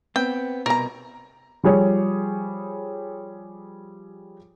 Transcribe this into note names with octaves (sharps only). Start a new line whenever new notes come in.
B3 C4 G5
C2 B2 A#4 A#5
F3 G3 G#4 C#5